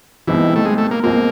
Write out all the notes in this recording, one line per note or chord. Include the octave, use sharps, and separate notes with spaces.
C#2 B2 E3 G3 C4 D#4
A3
G#3
A3
A#3
C#2 B2 G3 A#3 C4 F4